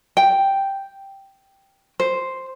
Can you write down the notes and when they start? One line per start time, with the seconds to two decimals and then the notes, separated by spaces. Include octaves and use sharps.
0.17 G5
2.00 C5